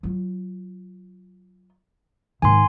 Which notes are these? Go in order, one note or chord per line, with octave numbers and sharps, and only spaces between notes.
F#3 F4
G#2 D#3 G#5 C6